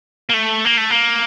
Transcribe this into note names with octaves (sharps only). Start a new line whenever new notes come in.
A#3
A3
A#3
A3
A#3